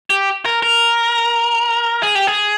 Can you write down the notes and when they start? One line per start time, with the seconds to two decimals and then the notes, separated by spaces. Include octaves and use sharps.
0.10 G4
0.45 A#4
0.63 A#4
2.03 G#4
2.15 G4
2.27 G#4